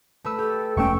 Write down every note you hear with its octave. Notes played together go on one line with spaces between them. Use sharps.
A3 B4 E6
G4 A4
F1 A3 C#4 G5 C#6 E6